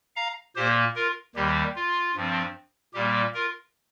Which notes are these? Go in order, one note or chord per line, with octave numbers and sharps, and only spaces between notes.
F5 A#5
A#2 A#3 G4 C5
F4 A#4
D#2 D#3 G3 G4
F4
G2 F3 C4
A#2 G3 A#3 G4
F4 A#4